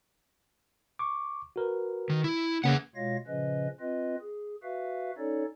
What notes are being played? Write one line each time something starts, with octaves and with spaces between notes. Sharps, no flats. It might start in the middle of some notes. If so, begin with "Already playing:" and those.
C#6 D6
F#4 A#4 B4
D#3
E4
C#3 A#3 C#4 G#4 B4 F#5
B2 G#3 F4 C#5 F5 A#6
A#2 C#3 F3 C#4 B4 D#5
C4 F4 B4 D#5
G#4
F#4 B4 E5 F5
C#4 D#4 A4 C#5 D5